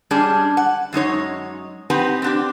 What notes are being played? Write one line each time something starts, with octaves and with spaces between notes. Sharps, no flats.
G3 G#3 C#4 D4 G#4
F#5
F#2 G#3 D#4 C#5
C4 D#4 G4 B4 F#5 G#5
C4 D4 G4